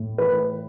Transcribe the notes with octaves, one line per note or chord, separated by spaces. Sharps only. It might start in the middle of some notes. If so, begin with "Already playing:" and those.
Already playing: A2
E3 B4